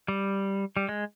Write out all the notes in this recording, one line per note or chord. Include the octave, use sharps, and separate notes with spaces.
G3
G3
G#3